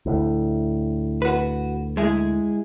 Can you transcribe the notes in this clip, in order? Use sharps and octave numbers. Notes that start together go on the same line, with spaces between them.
D2 A2
F#4 B4
G#3 E4 G#4